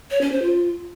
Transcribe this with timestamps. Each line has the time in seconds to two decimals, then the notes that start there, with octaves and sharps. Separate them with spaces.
0.11 C#5
0.21 C#4
0.32 C5
0.42 F4